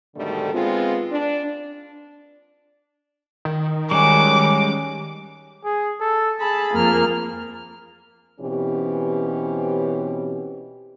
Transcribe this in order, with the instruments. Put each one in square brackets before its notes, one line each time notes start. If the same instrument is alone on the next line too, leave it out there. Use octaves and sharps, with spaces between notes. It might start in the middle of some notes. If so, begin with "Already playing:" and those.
[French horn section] G#2 B2 D3 D#3 G3 A3
G#3 B3 C4 F4
D4
[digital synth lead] D#3
[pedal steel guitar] G3 G#3 F#4 [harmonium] C#4 [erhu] D6
[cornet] G#4
A4
[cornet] G#4 [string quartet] A5 B5
[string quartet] F2 A#3 F6
[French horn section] B2 E3 C4 C#4 G4